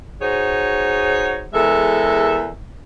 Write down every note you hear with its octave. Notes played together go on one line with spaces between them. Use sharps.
D#4 F#4 G#4 C5 C#5
E2 G#3 A4 A#4 E5